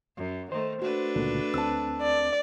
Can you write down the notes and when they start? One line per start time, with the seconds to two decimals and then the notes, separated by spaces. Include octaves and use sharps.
0.17 F#2
0.52 D#3 A3 C5
0.82 A3 D4 F#4 B4
1.16 C#2 A#2 D3
1.54 D2 C4 A5 E6
2.01 D5